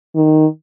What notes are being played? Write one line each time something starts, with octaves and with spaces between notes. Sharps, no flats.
D#3